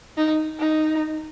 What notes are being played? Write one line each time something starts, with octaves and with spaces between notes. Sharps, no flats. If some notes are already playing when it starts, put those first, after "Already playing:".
D#4
D#4